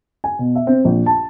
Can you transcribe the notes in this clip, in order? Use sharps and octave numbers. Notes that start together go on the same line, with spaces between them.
G#5
B2
E5
C4
A#1
A5